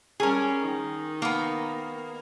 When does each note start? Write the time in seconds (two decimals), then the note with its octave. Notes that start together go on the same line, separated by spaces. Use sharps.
0.20 G3 C#4 G#4 A#4
0.61 D#3 D#4
1.22 A#3 B3